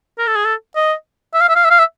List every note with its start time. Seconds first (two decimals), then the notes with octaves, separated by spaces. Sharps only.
0.18 A#4
0.27 A4
0.36 G#4
0.45 A4
0.76 D#5
1.34 E5
1.41 F5
1.49 E5
1.56 F5
1.64 E5
1.71 F5
1.79 E5